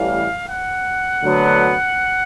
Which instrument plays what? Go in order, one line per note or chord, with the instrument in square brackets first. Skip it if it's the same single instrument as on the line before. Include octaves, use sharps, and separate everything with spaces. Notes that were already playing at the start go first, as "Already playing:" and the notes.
Already playing: [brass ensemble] A1 A2 E3 G3 F5
F#5
D2 D3 F#3 B3